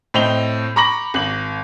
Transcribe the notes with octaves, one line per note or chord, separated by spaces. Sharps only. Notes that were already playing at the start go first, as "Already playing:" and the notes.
A2 C4 D#5 F7 G7
A#5 B5 C#6 D6 A#6 F#7
G#1 F#7